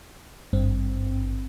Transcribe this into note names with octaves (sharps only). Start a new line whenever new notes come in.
G#1 G2 C4